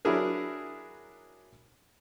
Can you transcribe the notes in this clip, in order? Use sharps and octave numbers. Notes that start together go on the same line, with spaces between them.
F#3 D4 E4 G#4 A#4